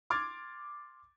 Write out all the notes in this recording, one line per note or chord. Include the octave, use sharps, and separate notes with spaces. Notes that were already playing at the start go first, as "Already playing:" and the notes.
C6 D6 F6 G#6 A6